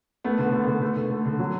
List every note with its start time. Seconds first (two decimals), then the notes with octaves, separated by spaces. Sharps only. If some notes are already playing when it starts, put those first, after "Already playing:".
0.24 A3 B3
0.38 D3 B3
0.52 A3
0.63 D3 B3
0.82 A3
0.96 D3
1.11 A3
1.25 D3
1.39 F#3